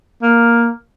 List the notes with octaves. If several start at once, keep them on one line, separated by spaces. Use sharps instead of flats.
A#3